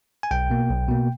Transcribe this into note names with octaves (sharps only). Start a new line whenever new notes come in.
G#5
B1 G5
B2 A#3
B1
B2 A#3